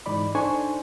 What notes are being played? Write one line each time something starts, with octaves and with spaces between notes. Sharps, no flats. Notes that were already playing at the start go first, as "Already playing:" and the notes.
G#2 E3 D#4 D5 B5
D4 D#4 A4 C5 G#5 C#6